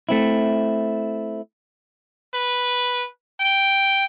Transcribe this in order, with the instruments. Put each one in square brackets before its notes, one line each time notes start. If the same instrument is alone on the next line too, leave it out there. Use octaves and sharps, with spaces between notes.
[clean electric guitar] A3 C4 E4
[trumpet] B4
G5